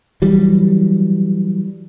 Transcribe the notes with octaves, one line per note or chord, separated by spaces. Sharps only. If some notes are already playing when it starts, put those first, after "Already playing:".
E3 F#3 G3